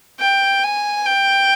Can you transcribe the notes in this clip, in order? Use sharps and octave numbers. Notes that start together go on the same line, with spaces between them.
G5
G#5
G5